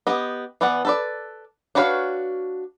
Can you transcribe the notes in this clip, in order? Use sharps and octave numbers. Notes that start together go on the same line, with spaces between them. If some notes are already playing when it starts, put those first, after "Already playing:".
B3 G4 D#5
E3 B3 D5 F#5
A4 B4 D5
D4 F#4 B4 C#5 F5